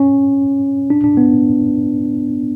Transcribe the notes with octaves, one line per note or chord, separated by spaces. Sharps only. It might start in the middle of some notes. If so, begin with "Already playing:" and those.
Already playing: C#4
D4
D4
B3